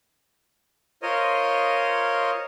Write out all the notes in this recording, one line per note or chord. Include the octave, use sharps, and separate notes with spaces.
F4 A#4 C5 C#5 D#5 D#6